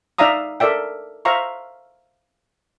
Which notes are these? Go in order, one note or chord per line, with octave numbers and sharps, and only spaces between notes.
D#4 D5 E5 F5 A#5 D#6
A4 A#4 D5 E5 G5
C5 E5 F5 A#5 C#6